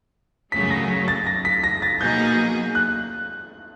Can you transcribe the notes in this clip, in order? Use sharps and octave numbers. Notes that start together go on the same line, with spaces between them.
F#2 C#3 F#3 A3 C#4 B6
A#6
A6
A#6
B6
A#6
A6
B2 F#3 A#3 D#4 G#4 G6
F#6